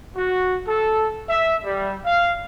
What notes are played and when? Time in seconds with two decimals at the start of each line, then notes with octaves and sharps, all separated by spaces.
0.16 F#4
0.67 A4
1.29 E5
1.64 G3
2.06 F5